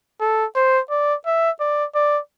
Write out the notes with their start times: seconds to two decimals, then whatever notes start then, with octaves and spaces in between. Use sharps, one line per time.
0.21 A4
0.56 C5
0.90 D5
1.26 E5
1.60 D5
1.95 D5